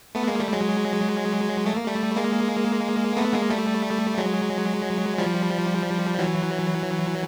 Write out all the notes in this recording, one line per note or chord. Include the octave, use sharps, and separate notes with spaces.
A3 B3
G#3 A#3
G3 A3
F#3 G#3
A3
A#3
G3 A3
G#3 A#3
A3 B3
G#3 A#3
G3 A3
F#3 G#3
F3 G3
E3 F#3